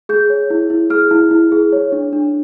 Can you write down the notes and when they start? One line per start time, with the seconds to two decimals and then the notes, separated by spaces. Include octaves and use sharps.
0.09 G#4 G6
0.30 C#5
0.50 E4
0.70 E4
0.90 G#4 F6
1.11 E4
1.31 E4
1.52 G#4
1.72 C#5
1.92 D4
2.13 D4